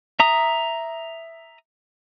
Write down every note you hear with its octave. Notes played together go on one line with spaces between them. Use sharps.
E5 A#5 D#6